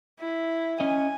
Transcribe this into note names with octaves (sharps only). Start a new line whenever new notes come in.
E4
C#4 D#5 G#5